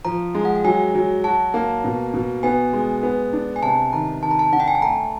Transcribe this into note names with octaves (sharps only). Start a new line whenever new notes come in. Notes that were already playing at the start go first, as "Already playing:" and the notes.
F3 A#5
G#3
F#5
G5
F#3 G#5
F#3
F#4 A5
A#3
B2
B2
B3 G#5
G#3
B3
D4
G#5
C3 A5
D#3 A#5
D#3 A5
A#5
A5
D4 F#5
G5
G#5
A5
A3 A#5